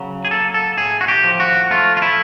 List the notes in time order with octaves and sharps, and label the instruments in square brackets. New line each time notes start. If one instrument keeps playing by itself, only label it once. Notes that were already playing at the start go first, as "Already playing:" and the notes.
Already playing: [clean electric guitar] C#3 F#3
G#4
A#3 A4
A4
A2 G#4
F#4
G4
F3
F#4
A3 F4
F4
E4